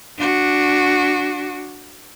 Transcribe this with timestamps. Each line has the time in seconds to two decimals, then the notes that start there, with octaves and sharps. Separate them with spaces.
0.18 D4 F#4